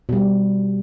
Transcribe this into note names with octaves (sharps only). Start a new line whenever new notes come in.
B2 G3